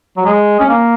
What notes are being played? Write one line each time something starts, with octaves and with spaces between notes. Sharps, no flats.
F#3
G#3
C#4
A#3